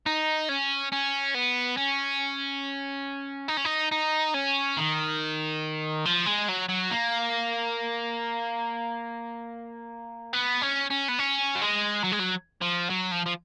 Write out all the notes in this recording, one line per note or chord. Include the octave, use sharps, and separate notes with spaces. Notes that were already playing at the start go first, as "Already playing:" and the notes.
D#4
C#4
C#4
B3
C#4
D#4
C#4
D#4
D#4
C#4
D#3
F3
G#3
F#3
F#3
A#3
B3
C#4
C#4
B3
C#4
F#3
G#3
F#3
G#3
F#3
F3
F#3
F3
F3